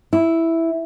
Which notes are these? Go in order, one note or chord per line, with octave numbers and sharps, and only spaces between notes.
E4